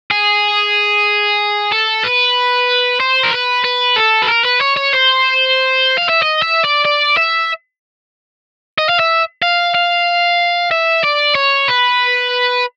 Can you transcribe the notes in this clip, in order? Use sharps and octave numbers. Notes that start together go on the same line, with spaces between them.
G#4
A4
B4
C5
A#4
B4
B4
A4
B4
A#4
B4
C#5
C#5
C5
F5
E5
D#5
E5
D5
D5
E5
D#5
F5
E5
F5
F5
E5
D5
C#5
B4